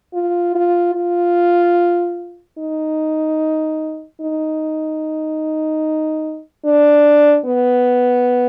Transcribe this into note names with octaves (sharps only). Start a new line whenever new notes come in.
F4
F4
F4
D#4
D#4
D4
B3